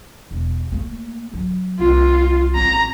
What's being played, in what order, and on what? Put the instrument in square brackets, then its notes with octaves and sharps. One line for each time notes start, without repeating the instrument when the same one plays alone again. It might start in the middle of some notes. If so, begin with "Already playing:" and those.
[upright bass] E1
A3 A#3
F#3
[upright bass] C2 D4 [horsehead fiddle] F4
[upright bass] A1 C4 [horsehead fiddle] A#5